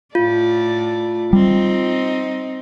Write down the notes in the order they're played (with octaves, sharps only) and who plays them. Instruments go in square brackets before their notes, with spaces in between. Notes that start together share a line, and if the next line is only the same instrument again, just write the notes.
[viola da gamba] A2 A3 D5 [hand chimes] F4
[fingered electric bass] G3 [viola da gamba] C4 D#4